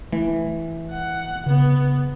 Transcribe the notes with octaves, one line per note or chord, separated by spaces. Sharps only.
E3 A3
F#5
C#3 B3